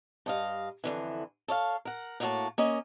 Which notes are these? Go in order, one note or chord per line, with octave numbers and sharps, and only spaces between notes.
G2 D#5 F5
F2 D3 E3
A4 C#5 D5 F5
A#4 F#5
A2 A#3 E4 F#4 C#5 A5
A#3 C#4 D#5